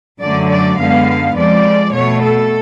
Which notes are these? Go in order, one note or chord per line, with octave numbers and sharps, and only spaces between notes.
F#2 D3 F#3 A3 D5
D5
F#2 D3 G#3 B3 F5
F2 F3 G#3 D5
B2 A3 C#5
A4